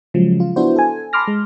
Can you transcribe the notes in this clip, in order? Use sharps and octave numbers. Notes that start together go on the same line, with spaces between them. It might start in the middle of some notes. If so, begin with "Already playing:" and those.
C#3 F3 F#3 G#3
F4
B3 D4 E4 F#4 C5
A4 G#5
A5 B5 C6 D6 F6 A#6
G#3